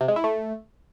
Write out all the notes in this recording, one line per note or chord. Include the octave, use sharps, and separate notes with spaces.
C3
G#3
E4
A3